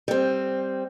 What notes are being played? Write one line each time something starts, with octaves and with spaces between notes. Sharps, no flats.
G3 C4